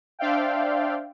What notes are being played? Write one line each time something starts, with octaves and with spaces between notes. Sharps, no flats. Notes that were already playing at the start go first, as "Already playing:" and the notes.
D4 C5 D5 E5 F5 G5